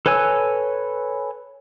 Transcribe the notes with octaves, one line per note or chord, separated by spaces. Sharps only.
A4 B4 C#5 G#5 E6